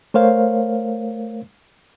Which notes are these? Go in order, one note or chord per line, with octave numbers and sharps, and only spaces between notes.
A3 A#4 C5 C#5 F5